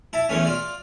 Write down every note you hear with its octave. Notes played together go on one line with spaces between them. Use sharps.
E4 A5
E2 E3 A3 C#4
F4 D5